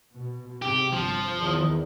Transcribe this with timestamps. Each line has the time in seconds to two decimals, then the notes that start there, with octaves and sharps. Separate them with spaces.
0.14 B2
0.62 G#2 C3 G4
0.93 G1 F3
1.39 E2 D#3